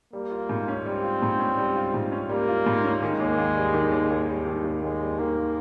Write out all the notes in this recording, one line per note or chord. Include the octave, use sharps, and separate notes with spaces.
G3 A#3
F4
G#2
C#4
G3 C4
F4
G#2
C#4
G3
F4
G#2
C#4
G3 A#3
F4
G#2
C#4
D#3 G#3
D#2
D#2
G3
D#3
D#2
D#2
G3
D#3
D#2
D#2 G#3
G3
D#3 A#3